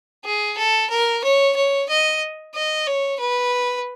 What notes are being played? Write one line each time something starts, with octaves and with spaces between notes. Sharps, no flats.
G#4
A4
A#4
C#5
C#5
D#5
D#5
C#5
B4